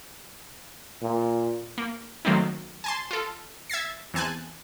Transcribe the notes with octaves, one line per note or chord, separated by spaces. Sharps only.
A#2
A#3
D#3 F#3 A3 A#3 C4 D#4
G#5 A5 C6
F4 A4
E5 G#6 A6 C7
E2 C4 G#5 A5 F#6